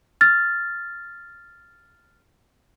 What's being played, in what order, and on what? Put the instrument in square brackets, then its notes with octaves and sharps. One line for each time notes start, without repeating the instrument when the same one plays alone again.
[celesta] F6 A6